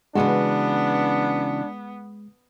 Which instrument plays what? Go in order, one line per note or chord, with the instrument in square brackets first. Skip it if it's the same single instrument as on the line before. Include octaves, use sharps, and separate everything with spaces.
[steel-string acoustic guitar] C#3 E3 F#4 [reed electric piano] G#3 [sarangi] B3 [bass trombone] D4